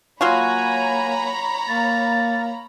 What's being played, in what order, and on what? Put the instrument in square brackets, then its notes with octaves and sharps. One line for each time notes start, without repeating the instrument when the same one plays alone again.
[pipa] F#3 F4 F#4 [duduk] A#3 [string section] C#5 A#5 B5 [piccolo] G#5
[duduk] A#3 [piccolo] A6